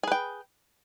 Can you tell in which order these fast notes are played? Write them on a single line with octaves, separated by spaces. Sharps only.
G#4 B4 G5